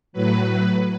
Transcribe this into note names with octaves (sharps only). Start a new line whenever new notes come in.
A2 F#3 B4